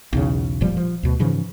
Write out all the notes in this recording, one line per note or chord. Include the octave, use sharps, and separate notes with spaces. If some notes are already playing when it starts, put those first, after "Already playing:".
B1 E2 C#3
F1 A#2 F3 G3
F3
D2 B2
G#2 C#3 E3 F3